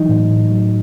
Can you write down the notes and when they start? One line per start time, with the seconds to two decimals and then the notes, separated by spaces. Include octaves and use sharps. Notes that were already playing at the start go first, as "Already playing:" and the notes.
Already playing: E3 F#3 D#4
0.09 A2
0.29 A2
0.51 F#3